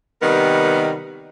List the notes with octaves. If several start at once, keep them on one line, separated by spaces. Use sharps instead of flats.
C3 D#3 G3 B3 A#4